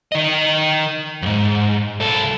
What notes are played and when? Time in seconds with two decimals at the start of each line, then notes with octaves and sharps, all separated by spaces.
0.12 D#3 D#5
1.22 F2 G#2
2.00 C2 A4